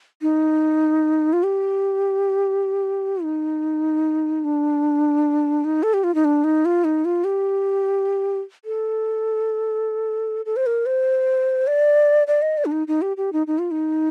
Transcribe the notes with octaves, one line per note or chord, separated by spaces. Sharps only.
D#4
F4
G4
D#4
D4
D#4
A4
G4
F4
D#4
D4
D#4
F4
D#4
F4
G4
A4
A4
C5
A#4
C5
D5
D5
D#5
D5
D4
D#4
D#4
G4
G4
D#4
D#4
F4
D#4